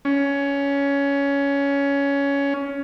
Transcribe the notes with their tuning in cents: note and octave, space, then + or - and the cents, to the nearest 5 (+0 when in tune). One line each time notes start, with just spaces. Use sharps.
C#4 +15